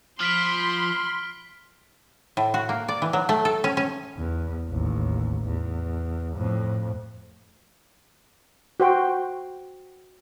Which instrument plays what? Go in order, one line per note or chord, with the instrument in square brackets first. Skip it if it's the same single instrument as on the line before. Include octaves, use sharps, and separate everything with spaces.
[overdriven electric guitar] F3 [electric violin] B5 C6 [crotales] F6 B6 D7
[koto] A2
F#4
A#3
D5
E3
F#3
A3
A4
C#4
C#4
[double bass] E2
A1 D#2
E2
F2 A2
[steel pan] F#4 C5 G5